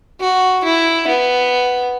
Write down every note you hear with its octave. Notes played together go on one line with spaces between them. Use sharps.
F#4
E4
B3